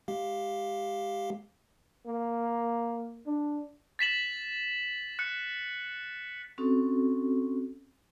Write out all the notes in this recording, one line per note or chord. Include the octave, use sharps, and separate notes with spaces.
G#3 G4 F5
A#3
D4
A6 B6 E7 F#7
F#6 C#7
C4 C#4 F#4 A4